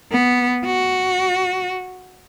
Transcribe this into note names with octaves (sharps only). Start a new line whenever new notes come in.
B3
F#4